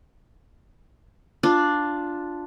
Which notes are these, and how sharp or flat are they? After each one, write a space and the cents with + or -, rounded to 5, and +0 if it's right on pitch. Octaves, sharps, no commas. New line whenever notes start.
D4 +0 F4 +0